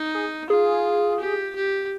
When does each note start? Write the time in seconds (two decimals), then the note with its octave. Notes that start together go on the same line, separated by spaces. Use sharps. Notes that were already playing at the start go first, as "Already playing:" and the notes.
Already playing: D#4
0.15 G#4
0.49 F4 G#4
1.20 G4
1.55 G4